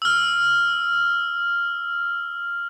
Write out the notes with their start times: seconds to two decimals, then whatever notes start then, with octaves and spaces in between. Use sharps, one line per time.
0.02 E6 F6